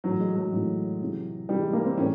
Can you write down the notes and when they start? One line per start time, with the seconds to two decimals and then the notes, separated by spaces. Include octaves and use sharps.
0.04 A2 E3 F#3
0.20 G#3
0.35 F#3
0.53 A2 E3
1.01 C3 E3
1.49 C3 E3 G3
1.61 G#3
1.73 A#3
1.84 C4
1.97 A2 E3 C#4